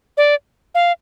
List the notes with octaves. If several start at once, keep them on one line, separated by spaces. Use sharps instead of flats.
D5
F5